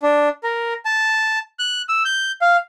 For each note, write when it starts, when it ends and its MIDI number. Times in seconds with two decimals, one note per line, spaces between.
0.03 0.29 62
0.43 0.74 70
0.85 1.39 81
1.59 1.82 90
1.89 2.03 88
2.05 2.32 91
2.41 2.57 77